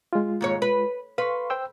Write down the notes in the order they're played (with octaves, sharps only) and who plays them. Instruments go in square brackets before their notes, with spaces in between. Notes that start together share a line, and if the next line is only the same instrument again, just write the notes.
[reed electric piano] G#3 F4
[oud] D#2 G#2 C#5
B4
[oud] B4 [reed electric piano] F5 C6 C#6
[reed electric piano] C5 G5 E6